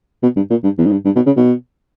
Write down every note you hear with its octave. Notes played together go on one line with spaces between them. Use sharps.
B2
G2
A#2
G2
E2
G#2
G2
G2
B2
C#3
B2